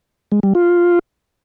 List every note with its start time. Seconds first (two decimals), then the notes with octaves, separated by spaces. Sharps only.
0.32 G#3
0.43 G3
0.55 F4